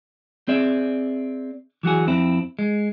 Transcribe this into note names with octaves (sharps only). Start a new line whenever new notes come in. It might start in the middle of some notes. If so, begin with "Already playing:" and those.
C4 G#4 D5 E5
E3 F#3 F#4 G#4
F2 C4 E4
G#3